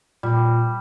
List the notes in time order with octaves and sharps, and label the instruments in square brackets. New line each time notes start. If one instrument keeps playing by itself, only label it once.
[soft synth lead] A#2 [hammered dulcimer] G3